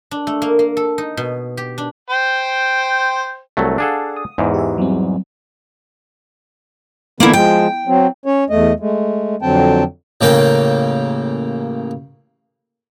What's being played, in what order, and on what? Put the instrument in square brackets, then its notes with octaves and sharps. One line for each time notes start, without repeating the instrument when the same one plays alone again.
[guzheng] D4
A3
A#3
A#3
A4
D#4
B2
G4
D4
[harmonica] C5 G5
[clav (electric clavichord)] C2 F#3 A3
[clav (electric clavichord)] D4 G#4 A4 [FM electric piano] F5 F#5
[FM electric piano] D#6
[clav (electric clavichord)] E2 G#2
[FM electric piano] G4 E5
F#3 G3 C4
[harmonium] D3 E3 B3 [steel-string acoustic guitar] A#3 E4
[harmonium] F3 G#3 [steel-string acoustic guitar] G5
[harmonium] F#3 C4
C#4 C#5
E2 A3 D#5
G#3 A3
F2 D3 F#3 C4 G5 A5
[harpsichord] A1 C#3 A#3 G5